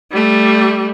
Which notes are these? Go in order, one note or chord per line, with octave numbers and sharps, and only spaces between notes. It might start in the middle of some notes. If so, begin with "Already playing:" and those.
G3 A3